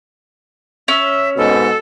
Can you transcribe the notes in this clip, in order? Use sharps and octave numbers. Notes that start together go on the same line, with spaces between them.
C#4 E5
G#2 B2 A4